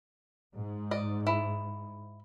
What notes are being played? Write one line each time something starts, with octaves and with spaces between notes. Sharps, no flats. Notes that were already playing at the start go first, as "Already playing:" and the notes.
G#2
D5 D#5
E4